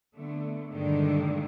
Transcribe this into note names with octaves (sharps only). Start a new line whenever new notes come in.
D3 A3 B3
G2 A#2 D3 D#3 G#3 D4